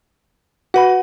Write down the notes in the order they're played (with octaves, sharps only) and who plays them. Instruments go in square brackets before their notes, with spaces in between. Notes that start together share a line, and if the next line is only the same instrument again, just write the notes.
[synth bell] F#4 B4 B5 [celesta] F#5